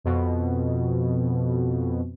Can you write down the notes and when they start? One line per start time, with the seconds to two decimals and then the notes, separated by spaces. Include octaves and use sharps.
0.04 F2 B2